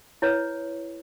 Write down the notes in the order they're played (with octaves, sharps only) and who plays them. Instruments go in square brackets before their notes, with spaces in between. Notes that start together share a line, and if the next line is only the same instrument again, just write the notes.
[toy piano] E4 B4 C#5